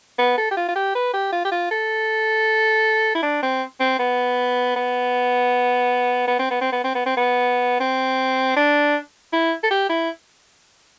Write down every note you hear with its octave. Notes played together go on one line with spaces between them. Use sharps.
B3
A4
G4
F4
F4
G4
B4
G4
F4
G4
F4
A4
E4
D4
C4
C4
B3
B3
B3
C4
B3
C4
B3
C4
B3
C4
B3
C4
D4
E4
A4
G4
E4